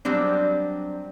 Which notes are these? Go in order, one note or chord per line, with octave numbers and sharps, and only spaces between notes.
F#3 G3 C4 D4